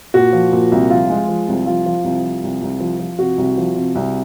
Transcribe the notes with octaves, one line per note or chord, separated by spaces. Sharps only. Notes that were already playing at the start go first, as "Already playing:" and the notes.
A#2 F#4
F3
A#2
C2
F3 F4
G#3
F3
C2
F3 F4
F3
C2
F3
C2
C2
F3
F3
C3 F#4
C2
F3
C3
C2